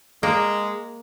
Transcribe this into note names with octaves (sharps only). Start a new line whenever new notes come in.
G#3 A#3